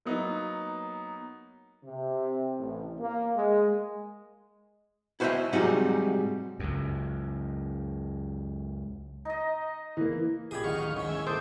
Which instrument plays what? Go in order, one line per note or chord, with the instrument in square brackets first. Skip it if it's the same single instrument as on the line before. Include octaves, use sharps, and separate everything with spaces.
[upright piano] F#3 A#3 B3 D#4
[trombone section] C3
A1
A#3
G#3
[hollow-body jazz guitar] E4 F#4 C5 C#5 D#5 E5
G#2 C3 F#3 G3 D#4 F#4
[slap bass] C#2 F#2
[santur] D#4 D#5
[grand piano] E3 A#3
[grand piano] A#1 G4 G#6 [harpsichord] G#4 B5
[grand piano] D1 A1 F#5 [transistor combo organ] D#3 F5 C#6
[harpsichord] G#2 D#3 [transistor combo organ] C#4
[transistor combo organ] E5 G#5
[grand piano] G1 A#3 D#6 [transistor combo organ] A4 D6 [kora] C5